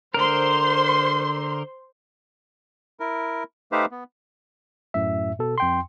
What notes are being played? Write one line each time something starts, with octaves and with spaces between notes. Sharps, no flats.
D3 A#4 C5 C6
E4 A#4
A3 D#4 G4 B4 C5 F5
B3
F#2 A2 E5
B2 A4
F2 G5 C6